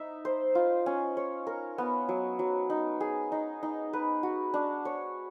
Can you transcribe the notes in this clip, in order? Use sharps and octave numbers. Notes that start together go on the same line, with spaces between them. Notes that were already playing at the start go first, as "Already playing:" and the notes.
Already playing: D#4 E5
C5
F4
C#4
C#5
A#4
B3
F#3
F#3
D#4
G#4
D#4
D#4
B4
F#4
D4
C#5